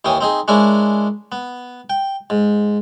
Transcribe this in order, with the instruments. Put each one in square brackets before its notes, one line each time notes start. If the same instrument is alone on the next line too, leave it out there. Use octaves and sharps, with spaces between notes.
[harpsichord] D#2 E3 C#4 G5 D#6
C4 D#4 G#4
G#3 C#4 D4 E4 A#4
B3
G5
G#2